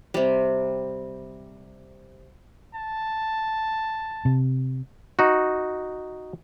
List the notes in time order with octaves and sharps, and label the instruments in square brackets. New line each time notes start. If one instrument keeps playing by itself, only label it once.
[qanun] C3 G3
[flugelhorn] A5
[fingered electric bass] C3
[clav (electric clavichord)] D#4 F#4